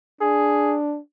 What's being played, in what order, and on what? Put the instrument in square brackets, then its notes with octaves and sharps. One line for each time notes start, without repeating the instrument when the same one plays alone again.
[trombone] D4 [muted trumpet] G#4